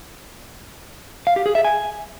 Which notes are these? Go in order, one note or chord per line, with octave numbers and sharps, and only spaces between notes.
F5
G4
G#4
E5
G#5